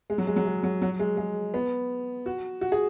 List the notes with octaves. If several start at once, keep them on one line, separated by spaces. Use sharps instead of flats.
G#3
F#3
G#3
F#3
G#3
F#3
F#3
G#3
G#3
B3
F#4
F#4
G#4